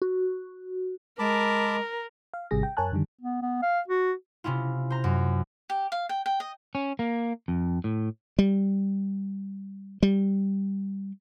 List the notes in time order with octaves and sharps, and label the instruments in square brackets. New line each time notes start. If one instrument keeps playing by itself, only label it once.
[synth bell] F#4
[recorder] G#3 [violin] A#4 [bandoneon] A5 B5 D6
[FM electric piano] F5
G#1 C3 G3 G#4 A#6
G5
F#2 A#4 C#5 G#5 A5 F#6
F#2 D3 D#3 G3
[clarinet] B3
B3
F5
F#4
[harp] C3 C#4 E4 F4
C5 A#5
F#2
[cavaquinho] G4
F5
G5
G5
D#5
[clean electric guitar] C#4
A#3
F2
A2
[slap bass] G3
G3